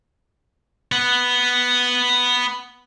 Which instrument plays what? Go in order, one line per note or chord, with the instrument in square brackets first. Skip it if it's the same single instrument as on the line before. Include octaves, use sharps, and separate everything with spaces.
[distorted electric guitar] B3 F#5